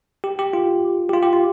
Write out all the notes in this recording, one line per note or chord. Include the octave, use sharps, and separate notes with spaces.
G4
G4
F4
G4
F4
G4
F4